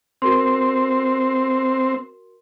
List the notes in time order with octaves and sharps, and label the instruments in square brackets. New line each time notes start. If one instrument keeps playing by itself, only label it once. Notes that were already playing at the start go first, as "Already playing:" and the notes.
[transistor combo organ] C4 [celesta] F#4 A#4 C6